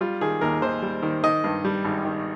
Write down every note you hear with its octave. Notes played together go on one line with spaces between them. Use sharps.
G3 F4
D#3 G#4
D#2 A#4
D#2 C5
G3
D#3
D#3 D#5
G2
G3
G#1
D#3